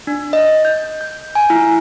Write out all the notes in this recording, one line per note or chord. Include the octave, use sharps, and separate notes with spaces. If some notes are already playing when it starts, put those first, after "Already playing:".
D4
D#5
G6
G6
G#5
E4